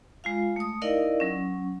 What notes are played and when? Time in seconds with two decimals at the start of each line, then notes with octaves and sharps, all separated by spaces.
0.24 G#3 F4 F5
0.56 A3 D#6
0.82 D#4 E4 A#4 D5 D#5 F5
1.20 F#3 C#4